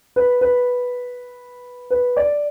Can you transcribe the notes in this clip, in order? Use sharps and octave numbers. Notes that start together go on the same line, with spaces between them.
B4
B4
B4
D5